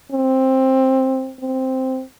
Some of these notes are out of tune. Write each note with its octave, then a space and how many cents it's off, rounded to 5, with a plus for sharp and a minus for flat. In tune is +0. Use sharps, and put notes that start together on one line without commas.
C4 +10
C4 +0